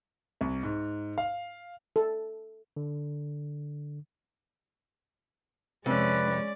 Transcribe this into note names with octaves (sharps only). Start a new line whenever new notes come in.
C2
G#2
F5
A4
D3
F2 C3 G#3 C#4 B4 D5